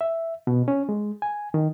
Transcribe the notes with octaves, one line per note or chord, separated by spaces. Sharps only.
E5
B2
C#4
G#3
G#5
D#3